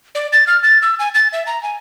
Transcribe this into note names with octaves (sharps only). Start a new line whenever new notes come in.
D5
A6
F6
A6
E6
G#5
A6
E5
A#5
G#5